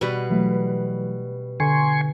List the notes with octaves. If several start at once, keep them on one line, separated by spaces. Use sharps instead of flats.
B2 G3 B4
E3 F#3 A3
D3 G#5 C6 C#6